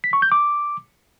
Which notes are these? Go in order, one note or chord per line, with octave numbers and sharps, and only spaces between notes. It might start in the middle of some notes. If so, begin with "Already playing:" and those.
B6
C#6
G6
D6